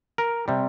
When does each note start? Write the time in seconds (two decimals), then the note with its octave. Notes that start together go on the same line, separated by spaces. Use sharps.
0.18 A#4
0.48 C3 G3